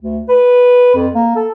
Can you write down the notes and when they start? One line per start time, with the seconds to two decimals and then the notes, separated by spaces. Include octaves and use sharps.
0.01 D2
0.29 B4
0.95 F2
1.15 A#3
1.36 A4